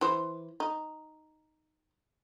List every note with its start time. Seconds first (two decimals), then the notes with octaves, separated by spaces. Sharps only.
0.01 E3 C5
0.60 D#4